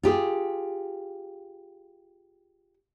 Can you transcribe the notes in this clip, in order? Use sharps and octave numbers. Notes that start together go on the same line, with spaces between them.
F4 G4 G#4